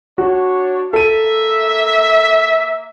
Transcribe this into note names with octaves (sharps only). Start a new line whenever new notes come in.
D4 F#4 C#5
A#3 A4 E5 D#7